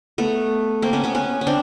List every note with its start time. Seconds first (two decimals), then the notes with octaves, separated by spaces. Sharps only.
0.18 A3 B3
0.82 A#3 C4
0.93 B3 C#4
1.04 B3 C#4
1.15 B3 C#4
1.41 C#4
1.47 C4 D4